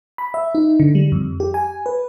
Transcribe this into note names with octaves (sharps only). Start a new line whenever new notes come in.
B5
E5
D#4
D3
G3
F2
G4
G#5
B4